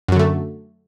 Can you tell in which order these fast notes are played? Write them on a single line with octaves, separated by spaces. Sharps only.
F#2 F#3 D3 A3